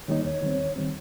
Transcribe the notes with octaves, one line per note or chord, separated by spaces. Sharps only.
D#3 G3 A#3 D#4 C#5
D#2 C#5
D#3 G3 C4
D#2
D#3 G3 C4